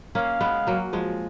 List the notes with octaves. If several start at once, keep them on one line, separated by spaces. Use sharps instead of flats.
A#3 C#4 F5
G#3 B3
F#3 A#3
F3 G#3